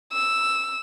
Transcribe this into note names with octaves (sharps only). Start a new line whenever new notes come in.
E6